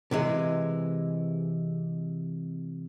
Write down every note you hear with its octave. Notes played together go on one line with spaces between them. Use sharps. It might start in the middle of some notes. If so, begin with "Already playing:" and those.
C3 E3 G#3